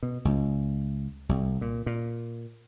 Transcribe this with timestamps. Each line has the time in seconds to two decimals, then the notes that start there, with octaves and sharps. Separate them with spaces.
0.03 B2
0.25 C#2
1.29 C2
1.61 A#2
1.86 A#2